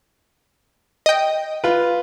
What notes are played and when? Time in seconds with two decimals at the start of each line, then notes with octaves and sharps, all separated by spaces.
1.06 D#5 G5
1.64 F4 B4